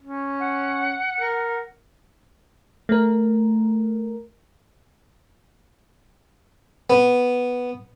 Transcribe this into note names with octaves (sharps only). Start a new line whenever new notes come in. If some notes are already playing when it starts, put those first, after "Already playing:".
C#4
F#5
A#4
A3 A#4
B3